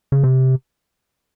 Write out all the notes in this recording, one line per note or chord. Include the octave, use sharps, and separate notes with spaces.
C#3
C3